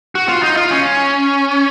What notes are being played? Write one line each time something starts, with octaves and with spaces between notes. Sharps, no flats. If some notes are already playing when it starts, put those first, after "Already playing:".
F#4
F4
D#4
F4
C#4